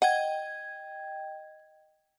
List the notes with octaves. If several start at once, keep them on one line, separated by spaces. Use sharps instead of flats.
D#5 F#5 G5 G#6